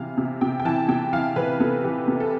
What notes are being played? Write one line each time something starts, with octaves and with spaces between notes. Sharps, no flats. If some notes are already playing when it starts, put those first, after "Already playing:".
Already playing: C3 E3 F5
C3
C3 G5
G5
E3 A5
C3 G5
E3 F5
E3 B4
C3 A4
E3 G4
C3
A4